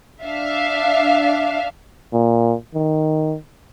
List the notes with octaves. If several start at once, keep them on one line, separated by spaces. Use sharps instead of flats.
D4 E5 F5
A#2
D#3